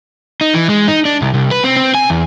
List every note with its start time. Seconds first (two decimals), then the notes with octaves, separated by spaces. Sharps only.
0.41 D#4
0.54 E3
0.69 G#3
0.88 D#4
1.05 D4
1.22 C2
1.34 C2
1.51 B4
1.64 C4
1.77 C4
1.95 G#5
2.10 E2